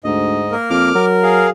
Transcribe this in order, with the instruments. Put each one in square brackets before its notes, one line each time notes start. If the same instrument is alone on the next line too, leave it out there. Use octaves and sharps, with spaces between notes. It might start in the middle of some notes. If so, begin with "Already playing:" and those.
[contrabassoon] D2 [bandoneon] G#2 D#5
[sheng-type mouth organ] A#3 A#4
[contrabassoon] F2 [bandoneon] D6 F6
[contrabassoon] F#3 [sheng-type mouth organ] A#4
[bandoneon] G#4 F5